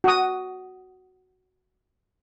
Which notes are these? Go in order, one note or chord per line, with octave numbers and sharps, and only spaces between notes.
F#4 D#6